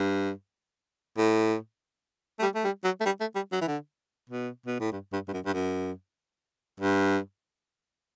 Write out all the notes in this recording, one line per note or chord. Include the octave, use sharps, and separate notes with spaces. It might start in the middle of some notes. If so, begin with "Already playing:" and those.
Already playing: G2
A2
A3
G3
A3
G3
F#3
A3
G3
A3
G3
F#3
E3
D3
B2
B2
A2
G2
G2
G2
F#2
G2
F#2
G2